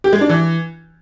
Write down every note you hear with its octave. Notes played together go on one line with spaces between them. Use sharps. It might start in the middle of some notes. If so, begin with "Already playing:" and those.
G4
G#3
D4
E3